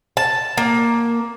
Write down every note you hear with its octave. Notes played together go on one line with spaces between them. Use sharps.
A5
A#3